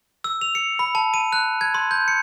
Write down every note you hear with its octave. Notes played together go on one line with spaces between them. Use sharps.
E6
F7
C#7
B5
A5
D#7
F#6
G#6
C6
G6
C#7